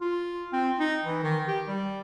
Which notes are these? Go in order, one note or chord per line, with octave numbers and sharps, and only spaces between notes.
F4
C4
D#4
E3
D#3
G4
G3